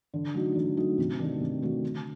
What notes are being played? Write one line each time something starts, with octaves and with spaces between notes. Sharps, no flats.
D3
F#3 A3 D#4 F#4
D3
F#3 A3 D#4 F#4
C3
D#3 A3 D4 F#4
C3
D#3 A3 D4 F#4
D3